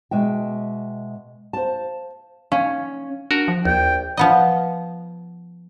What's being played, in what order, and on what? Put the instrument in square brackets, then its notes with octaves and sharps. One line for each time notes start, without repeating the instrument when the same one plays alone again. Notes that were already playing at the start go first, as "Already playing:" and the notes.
[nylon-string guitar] B2 G#3 E5 G5
C5 F5 A5
[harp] C#4 [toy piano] F5 G#5
[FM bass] D4 [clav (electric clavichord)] F#4 A#4
[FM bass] F3
[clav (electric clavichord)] A#1 [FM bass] D#2 [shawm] G5
[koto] F3 B3 D#5